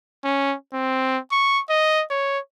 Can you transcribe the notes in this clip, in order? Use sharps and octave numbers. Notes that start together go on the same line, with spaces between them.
C#4
C4
C#6
D#5
C#5